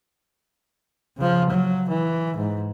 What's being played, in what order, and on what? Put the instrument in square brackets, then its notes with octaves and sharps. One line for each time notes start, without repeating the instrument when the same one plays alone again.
[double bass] C#3 F3
F#3
E3
G#2